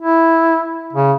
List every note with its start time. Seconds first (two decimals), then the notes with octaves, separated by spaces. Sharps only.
0.01 E4
0.93 C#3